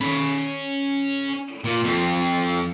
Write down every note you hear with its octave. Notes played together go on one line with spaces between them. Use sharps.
C#4 B5
A#2
F2 C4